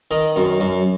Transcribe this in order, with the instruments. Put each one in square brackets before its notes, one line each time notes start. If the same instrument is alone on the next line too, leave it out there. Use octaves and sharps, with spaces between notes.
[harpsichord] D#3 D#5
F#2
F#2